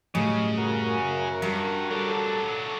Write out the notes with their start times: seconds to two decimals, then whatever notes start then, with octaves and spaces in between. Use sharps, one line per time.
0.15 A2 C#3 F#3 G3 D#5
0.58 F#2 F#4 A#4
1.42 G2 G3
1.91 F#3 D4 A4